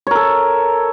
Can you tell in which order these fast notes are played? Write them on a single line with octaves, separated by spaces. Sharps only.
C#5 A#4 A4